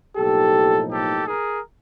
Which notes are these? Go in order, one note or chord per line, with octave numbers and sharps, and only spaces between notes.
B1 A2 F3 A#3 D#4 G4 A4
G4 A4
G#4 A#4